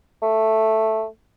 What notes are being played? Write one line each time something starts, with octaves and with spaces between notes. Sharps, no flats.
A3